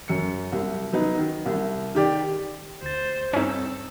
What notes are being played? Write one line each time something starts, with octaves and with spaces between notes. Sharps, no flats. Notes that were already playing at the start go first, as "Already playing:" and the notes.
F#2 C#7
C2
F#3 B3 D#4
D#3
C2
D#3 G4 D5
D2 C5 A6
G2 C4 C#4 D#4 A4